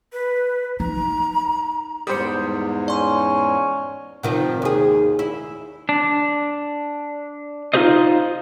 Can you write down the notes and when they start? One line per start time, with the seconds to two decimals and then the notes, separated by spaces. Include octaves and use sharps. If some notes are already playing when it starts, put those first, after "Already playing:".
0.12 B4
0.80 D#4 A#5
2.07 E2 G#2 G3 C5 D#6 C#7
2.88 C#4 D5 C6
4.23 C3 D#3 F3
4.62 D#2 G#4
5.19 E4
5.89 D4
7.74 D#4 F4 G4 G#4 C5 D#5